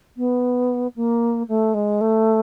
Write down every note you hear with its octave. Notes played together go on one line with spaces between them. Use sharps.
B3
A#3
A3
G#3
A3